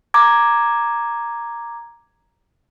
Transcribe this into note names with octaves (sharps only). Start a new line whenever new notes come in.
A#5 D6 G#6